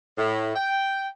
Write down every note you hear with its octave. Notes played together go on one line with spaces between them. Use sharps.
A2
G5